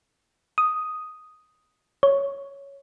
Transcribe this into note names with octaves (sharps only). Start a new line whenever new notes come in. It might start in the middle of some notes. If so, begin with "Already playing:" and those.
D#6
C#5